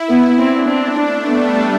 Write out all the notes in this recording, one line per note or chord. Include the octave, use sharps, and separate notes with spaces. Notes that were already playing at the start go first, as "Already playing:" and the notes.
Already playing: E4
B3
C4 D4
C4
A3 D4
G3 B3